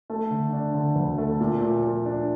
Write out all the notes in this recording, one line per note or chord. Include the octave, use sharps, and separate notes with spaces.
A3
D3
D4
D3
D2
A3
A#2
A#2
A#2
D4